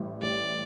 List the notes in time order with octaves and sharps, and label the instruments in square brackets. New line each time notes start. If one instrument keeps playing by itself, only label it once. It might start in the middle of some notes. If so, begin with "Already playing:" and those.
Already playing: [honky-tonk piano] A1 A2 G3
[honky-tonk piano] A1 [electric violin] D5